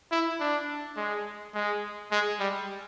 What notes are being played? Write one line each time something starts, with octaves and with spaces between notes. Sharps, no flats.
E4
D4
G#3
G#3
G#3
G3